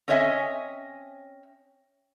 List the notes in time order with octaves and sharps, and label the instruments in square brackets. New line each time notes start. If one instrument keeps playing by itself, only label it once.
[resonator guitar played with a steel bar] C4 C#4 C#5 D#5 E5 G#5